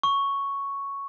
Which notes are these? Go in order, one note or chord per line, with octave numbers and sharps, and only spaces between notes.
C#6